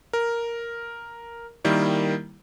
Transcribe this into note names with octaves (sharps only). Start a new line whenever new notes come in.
A#4
D#3 G3 A#3 E4